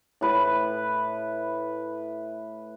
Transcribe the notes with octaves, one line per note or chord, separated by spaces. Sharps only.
A2 B4